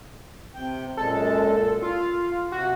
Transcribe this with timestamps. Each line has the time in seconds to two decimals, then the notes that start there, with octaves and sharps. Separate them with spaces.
0.55 C3 G5
0.97 F#2 A#2 G#3 A4
1.82 F4 F5
2.52 C3 F#4